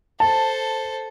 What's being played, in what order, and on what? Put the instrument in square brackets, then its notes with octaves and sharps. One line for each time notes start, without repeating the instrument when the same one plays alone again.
[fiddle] A4 C5 [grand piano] A5